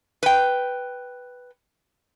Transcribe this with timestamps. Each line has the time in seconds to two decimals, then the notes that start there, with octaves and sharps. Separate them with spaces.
0.23 B4 G5